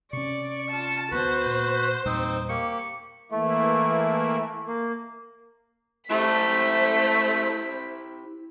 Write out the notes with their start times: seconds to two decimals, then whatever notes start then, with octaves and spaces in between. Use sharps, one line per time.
0.13 C3 C#4 D5 C#6
0.70 F4 A5
1.11 D2 A#3 B3 F#4 B4 C5
1.46 A#2
2.05 E2 A#2 G3 C4 D#4
2.49 A#3 G4 C#6
3.32 E3 A3 A#3 E4
4.67 A#3
6.11 A3 E4 G4 C5 B6